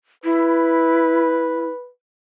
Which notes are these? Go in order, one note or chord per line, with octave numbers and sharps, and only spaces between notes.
E4 B4